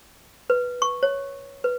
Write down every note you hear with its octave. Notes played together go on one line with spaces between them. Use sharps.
B4
C#6
C#5
B4